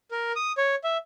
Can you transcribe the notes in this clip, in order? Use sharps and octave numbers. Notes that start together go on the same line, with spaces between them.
A#4
D#6
C#5
E5